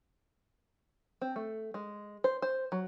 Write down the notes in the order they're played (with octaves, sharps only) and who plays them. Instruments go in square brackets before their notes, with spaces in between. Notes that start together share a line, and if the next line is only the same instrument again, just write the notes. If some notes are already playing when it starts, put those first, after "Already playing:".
[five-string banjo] C4
A3
G#3
C5
C5
F#3